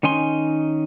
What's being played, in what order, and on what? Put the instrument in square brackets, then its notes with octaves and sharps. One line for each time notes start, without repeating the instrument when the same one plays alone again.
[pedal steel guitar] D#3 C#4 D#4 G#5 C6